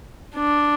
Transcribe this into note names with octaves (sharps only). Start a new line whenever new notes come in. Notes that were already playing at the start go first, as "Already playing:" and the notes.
D4